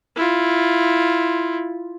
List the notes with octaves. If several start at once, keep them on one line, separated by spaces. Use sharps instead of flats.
E4 F4